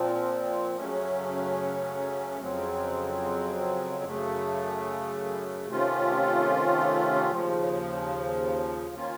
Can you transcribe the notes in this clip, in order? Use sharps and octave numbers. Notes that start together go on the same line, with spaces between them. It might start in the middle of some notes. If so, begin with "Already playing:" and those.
Already playing: A#2 F3 C4
F#2 C#3 F#3 A3 C#4
F2 C#3 F#3 C4
F#2 C#3 A3
C3 D#3 A3 C#4 F4
D#2 C#3 F3
D#3 A#3 C#4 F4